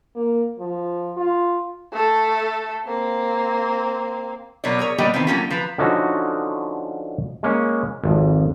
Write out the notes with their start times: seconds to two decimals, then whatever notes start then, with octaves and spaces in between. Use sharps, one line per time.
0.16 A#3
0.59 F3
1.17 F4
1.93 A3 A4
2.87 A#3 C4
4.64 B2 F#3 A#4 C#5 D5
4.79 G#4 A#4 C#5
4.98 A#2 G3 B3 G4 A#4 D#5
5.14 D#3 E3 B3 C4
5.27 F#3 A3 A#3 C#4 F4 G4
5.50 F3 B4 A#5
5.78 D3 F3 C#4 D#4 F#4
7.43 G#3 A#3 C#4
8.04 G#1 F2